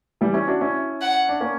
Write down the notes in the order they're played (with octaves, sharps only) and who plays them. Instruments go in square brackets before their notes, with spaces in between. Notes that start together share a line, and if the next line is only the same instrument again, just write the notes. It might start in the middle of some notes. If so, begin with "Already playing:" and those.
[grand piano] E3 G3
C#4 E4
D4 F#4
C#4 E4
[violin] F#5
[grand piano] D4
A#3 C#4